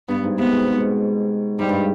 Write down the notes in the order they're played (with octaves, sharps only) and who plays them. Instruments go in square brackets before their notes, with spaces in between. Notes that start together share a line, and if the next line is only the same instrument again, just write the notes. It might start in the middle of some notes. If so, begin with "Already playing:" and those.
[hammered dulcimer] G2 [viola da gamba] B3
[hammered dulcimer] G#2
[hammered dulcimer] C3 [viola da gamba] B3
[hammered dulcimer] B2
G#2
B2
[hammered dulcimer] G#2 [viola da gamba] G3
[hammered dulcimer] G2